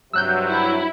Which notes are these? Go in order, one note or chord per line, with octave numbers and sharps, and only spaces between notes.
G2 C3 F#3 E6 F#6 G6
E4